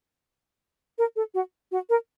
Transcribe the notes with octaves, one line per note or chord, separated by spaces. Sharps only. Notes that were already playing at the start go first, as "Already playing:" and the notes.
A#4
A4
F#4
F#4
A#4